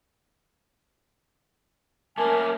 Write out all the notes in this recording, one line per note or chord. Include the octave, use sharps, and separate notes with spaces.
A3 A#3 C#4 A#4 G#5 A5 D6